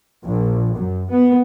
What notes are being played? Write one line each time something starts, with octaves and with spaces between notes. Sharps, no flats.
A#1
F#2
B3